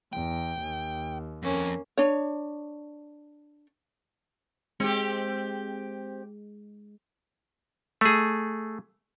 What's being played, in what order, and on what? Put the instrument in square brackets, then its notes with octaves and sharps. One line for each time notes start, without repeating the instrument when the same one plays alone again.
[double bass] E2 [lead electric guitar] G5
[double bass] D#2
[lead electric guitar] F2 [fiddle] A#3 C#4
[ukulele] D4 C#5
[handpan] G#3 [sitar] C4 G4
[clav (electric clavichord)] A3 G#4